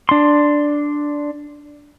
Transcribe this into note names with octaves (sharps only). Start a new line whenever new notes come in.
D4 C6